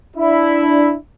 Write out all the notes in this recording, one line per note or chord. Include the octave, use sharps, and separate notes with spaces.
D4 E4